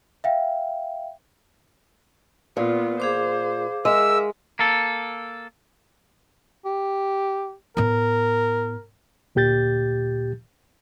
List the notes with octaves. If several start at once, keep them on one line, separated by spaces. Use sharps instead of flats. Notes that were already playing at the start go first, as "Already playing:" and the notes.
E5 F5 G5
A#2 B3 F4
G#4 C5 F5 D6
G#3 A#4 E5 E6
A#3 A4
G4
A2 B3 A#4
D2 A#2 G4 G6 A6